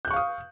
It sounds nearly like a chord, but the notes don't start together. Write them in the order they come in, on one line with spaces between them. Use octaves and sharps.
G6 F#6 C#6 F5 D#6